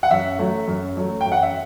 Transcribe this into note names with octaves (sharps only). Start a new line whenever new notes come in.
F#5
F#2 E5
F#3 A3
F#2
F#3 A3
F#2 G5
F#5
E5